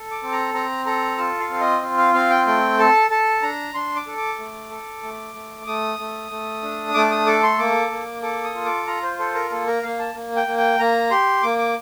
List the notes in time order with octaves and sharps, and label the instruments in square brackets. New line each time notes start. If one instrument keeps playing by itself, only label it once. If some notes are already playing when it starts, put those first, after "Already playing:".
Already playing: [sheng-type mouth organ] A4
D6
C4
A#5
C4 A#5
A4 A#5
F4 A5
F5
C4
D#5
F4
F5
C4 F5
G5
A3 G5
A4 A5
A4 A5
D4 A#5
D4 C6
D6
A4
D6
A3
A4
A3
A3
A3 D#6
A3
A3
D4
A3 D6
D#6
A4 D6
C6
A#3 D6
A#3
A4 D6
D#6
F4
D6
F4 A#5
C5
A4 C5
A#4
A#3 A4
A#4
A#3 F5
A5
A#3
G5
A#3
G5
A#3 A#5
G4 C6
A#3 D6
D6